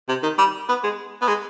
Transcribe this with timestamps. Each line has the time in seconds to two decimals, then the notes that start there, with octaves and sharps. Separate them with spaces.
0.09 C3
0.23 D#3
0.38 G3
0.69 B3
0.84 G#3
1.21 B3
1.28 G#3